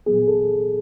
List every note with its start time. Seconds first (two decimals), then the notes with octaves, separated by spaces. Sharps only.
0.06 A#2 F#3 B3 G#4
0.28 A4